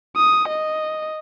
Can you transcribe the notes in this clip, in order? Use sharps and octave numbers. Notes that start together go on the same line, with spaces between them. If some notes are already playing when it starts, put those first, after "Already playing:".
D#6
D#5